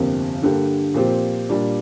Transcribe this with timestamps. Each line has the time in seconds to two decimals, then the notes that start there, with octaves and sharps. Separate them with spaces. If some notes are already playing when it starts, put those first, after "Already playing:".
Already playing: G1 F2 C3 A#3 G4
0.42 G2 D3 A#3 G4
0.94 A#2 F3 C4 G4
1.49 A#2 G3 D4